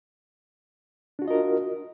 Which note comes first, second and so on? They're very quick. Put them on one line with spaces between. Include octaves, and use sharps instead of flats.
D4 F#4 F4 D#5 A#4